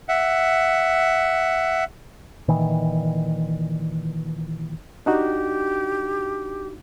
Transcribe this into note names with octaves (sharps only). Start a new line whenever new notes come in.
E5 F#5
A#2 D#3 E3
D4 D#4 F#4 G4